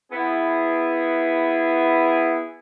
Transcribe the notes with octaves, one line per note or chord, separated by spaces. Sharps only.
B3 E4 G#4